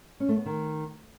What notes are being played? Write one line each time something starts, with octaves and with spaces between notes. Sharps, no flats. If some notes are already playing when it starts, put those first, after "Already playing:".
C#4
A3
B3
D#3